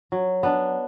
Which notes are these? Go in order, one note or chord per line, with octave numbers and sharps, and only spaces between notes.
F#3
B3 D4